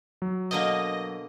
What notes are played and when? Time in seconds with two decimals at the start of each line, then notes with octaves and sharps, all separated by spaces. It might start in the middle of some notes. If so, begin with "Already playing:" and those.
0.22 F#3
0.51 B2 D3 A#3 D#5